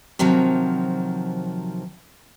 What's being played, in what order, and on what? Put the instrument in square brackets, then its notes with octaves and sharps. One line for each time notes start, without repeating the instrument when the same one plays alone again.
[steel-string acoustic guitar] C3 D#3 F3 F#3